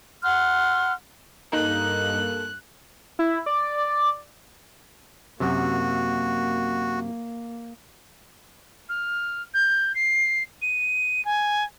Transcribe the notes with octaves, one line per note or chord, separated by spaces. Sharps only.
F#5 C6 F6 F#6
G2 A#3 D#4 A4 F#6
E4
D5
F#2 C3 A#3 F#4
F6
G6
C7
D#7
G#5